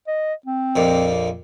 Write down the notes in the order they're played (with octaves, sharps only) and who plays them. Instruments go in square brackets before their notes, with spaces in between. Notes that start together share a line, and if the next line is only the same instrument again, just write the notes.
[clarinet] D#5
C4
[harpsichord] A#1 F2 A#2